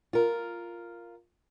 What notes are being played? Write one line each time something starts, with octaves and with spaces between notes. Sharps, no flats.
F4 A#4